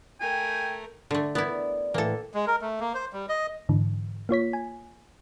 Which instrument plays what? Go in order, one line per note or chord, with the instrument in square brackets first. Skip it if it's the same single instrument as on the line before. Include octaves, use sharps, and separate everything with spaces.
[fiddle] A3 A#4 [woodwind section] G5 [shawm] G#5
[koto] D3 A3 [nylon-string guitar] A4
[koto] B3 E4 [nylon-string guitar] A#4 D5
[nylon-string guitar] A2 E3 [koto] A#3 A4
[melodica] G#3
A#4
A3
A#3
C5
G3
D#5
[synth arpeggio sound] G#2 D3 E3
A#3 F4 C#5 B6
G#5